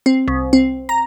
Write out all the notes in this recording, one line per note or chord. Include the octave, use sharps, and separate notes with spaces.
C4
C2
C4
A#5